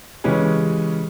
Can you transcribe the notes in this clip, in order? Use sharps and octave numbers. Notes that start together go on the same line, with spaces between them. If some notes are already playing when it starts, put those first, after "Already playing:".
C#3 E3 G#3 C#4 G4 B4